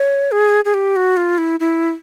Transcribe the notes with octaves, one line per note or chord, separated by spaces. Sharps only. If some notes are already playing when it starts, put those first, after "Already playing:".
Already playing: C#5
G#4
G#4
G4
F#4
F4
E4
E4